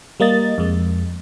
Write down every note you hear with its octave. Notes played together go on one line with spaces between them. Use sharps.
G3 A#3 D#5 A6
F2 G#3